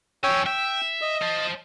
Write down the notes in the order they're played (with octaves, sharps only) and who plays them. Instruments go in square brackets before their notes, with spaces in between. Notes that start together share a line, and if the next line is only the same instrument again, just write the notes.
[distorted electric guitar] F2 C#4 [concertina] C#5 G5 E6
[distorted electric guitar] E5 [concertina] G5
[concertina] D#5
[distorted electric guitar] C5 A5